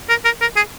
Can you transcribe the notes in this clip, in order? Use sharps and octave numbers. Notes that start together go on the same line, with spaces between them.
A#4
A#4
A#4
G#4